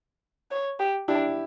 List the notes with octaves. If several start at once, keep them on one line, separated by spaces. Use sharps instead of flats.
C#5
G4
D4 E4 G4